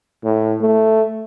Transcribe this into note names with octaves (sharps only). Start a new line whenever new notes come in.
A2
A3